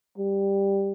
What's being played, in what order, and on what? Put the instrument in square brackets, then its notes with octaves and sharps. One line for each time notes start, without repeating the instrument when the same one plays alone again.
[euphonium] G3